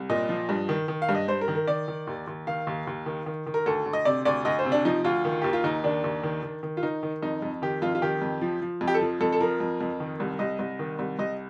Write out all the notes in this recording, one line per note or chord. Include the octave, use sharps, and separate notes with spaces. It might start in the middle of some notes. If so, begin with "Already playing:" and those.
Already playing: C2
A#2 D#5
F3
G2
D#3
D#3
F5
G2
D#5
G2 C5
A#4
D#3
A#4
D#3 D5
D#3
D#2
D#2
D#3 F5
D#2
D#2
D#3
D#3
D#3
A#4
D2 A4
D2
D#5
C3 D5
D2 D5
D2 D#5
C5
C3
D4
F3 D#4
D2 F4
D#3
D#2 G4
F4
D#2 D#4
D#3 D4
D#2
D#3
D#3
D#3
F4
D#3 D#4
D#3
F2 D#4
F2
D#3 G4
F2 F4
F4
D#3 G4
F2
F3
F3
F2
G4
A4
F3
F2 A4
A4
F3 A#4
F2
F2
D#3
C2
C2 D#5
C2
D#3
C2
C2 D#5